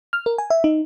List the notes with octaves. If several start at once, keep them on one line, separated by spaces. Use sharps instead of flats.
F6
A#4
G#5
E5
D#4